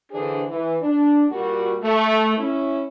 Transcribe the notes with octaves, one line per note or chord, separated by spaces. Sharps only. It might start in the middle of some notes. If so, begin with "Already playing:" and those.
D3 E3 D4 G#4 C5
E3
D4
A#2 G3 F#4
A3
C#4 E4